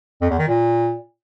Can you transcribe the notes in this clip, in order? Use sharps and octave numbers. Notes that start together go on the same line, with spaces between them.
F2
E2
D#3
A#2